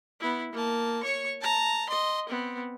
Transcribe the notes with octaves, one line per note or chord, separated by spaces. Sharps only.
B3 E4
A#3 A5
C#5 C#6
A5 A#5
D#5 C6
B3 C4